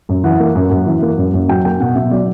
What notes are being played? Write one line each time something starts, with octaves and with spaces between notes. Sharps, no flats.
F#2
E3 F#5
A#3
F#2
F#2
E3
A#3
F#2
F#2
F#3 G5
A#3 G5
B2 F#5
B2 E5
F#3 D5